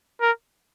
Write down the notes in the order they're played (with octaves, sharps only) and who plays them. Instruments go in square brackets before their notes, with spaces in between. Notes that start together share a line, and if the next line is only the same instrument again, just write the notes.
[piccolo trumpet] A#4